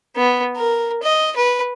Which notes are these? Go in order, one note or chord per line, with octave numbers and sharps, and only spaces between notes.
B3
A#4
D#5
B4